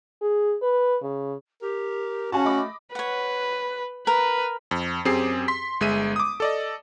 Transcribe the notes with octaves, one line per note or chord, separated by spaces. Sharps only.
G#4
B4
C#3
G4 A#4
C#4 F#4 F5 G#5 A5
A3 D#5 B5 D6
B4 C#5 F#5
A#4 B4
F2
F#2 C4 G4 G#4 C7
C6 B6
G1 G#3 E5 D#7
D6 D#6
A4 D5 D#5